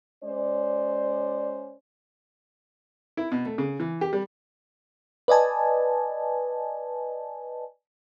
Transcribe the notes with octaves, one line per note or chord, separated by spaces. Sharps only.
G#3 C#4 C5 D5
E4
B2
A3
C#3
E3
G4
G3
B4 D5 D#5 G#5 A5